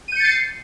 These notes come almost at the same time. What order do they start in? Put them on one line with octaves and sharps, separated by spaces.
D#7 G6 C#7 A6 C7